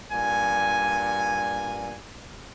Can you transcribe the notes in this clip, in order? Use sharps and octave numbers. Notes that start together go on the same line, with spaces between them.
G2 A#2 G#5